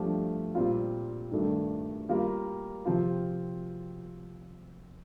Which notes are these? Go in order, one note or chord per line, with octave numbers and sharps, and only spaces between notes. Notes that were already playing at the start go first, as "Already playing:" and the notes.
Already playing: G2 F3 A3 D4 G4
A#2 G3 C4 F4
G2 D#3 A3 D4 A4
G3 A#3 F4 A#4
C3 F3 C4 F4